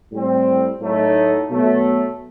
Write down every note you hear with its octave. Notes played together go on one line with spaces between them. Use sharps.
A2 G3 C4
A2 F#3 A3 D#4
B2 F#3 A3